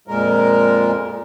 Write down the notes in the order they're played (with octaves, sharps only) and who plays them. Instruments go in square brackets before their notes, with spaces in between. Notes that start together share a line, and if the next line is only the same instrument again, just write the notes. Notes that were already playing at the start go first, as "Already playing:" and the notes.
[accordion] F2 A#2 G#3 A#4